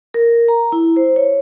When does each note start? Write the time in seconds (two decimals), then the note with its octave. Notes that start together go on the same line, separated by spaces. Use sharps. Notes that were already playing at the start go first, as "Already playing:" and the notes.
0.14 A#4
0.48 A#5
0.72 E4
0.96 C5
1.16 C#5